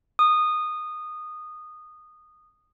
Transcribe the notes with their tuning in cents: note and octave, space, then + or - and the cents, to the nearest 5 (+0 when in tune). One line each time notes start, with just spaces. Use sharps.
D#6 -15